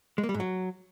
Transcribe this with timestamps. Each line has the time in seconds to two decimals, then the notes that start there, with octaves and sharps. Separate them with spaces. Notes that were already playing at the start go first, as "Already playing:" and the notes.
0.18 G#3
0.23 A#3
0.29 G3
0.34 G#2
0.40 F#3